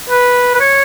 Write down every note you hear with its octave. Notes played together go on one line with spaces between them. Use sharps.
B4
B4
C#5